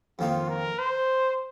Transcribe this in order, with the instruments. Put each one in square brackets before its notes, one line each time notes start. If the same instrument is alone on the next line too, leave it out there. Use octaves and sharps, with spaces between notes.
[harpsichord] F2 D#3 A#3 D#4 [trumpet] F4
[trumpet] A#4
C5